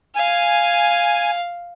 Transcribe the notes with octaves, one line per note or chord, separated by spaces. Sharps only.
F5 G#5